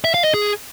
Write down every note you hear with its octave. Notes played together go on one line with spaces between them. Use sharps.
E5
F5
D#5
G#4